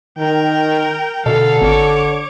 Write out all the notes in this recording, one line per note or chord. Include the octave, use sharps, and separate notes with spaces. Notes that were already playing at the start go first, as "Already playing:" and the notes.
D#3 A#4 G5
B2 D3 A4 F5
G#1 C#5 D6